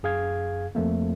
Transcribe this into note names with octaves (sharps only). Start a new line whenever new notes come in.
F#2 G#4 F5 G#6
F2 F3 A3 A#3